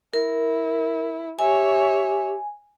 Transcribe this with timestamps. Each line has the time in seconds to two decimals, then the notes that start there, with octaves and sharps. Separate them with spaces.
0.14 E4 A#4
1.39 G4 C#5 E5 G#5